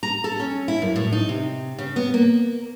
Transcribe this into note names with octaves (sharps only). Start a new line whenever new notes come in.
A#5
A4
C#4
E4
F#2
A2
D#4
C3
C#3
B3
A#3